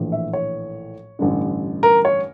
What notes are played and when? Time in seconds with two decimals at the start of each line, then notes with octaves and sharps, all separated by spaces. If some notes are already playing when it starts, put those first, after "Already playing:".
Already playing: A#1 A2 E3
0.12 E5
0.33 C#5
1.19 A1 G2 D3
1.83 A#4
2.05 C#5